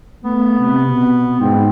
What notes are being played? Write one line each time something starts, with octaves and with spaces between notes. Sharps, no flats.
A3 B3
C3
B2
G#2 C4